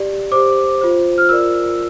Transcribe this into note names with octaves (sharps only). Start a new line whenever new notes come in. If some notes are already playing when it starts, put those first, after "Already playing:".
Already playing: G4 D5
G4 C5 D6
F4 C5
F6
F4 A#4 D5 E6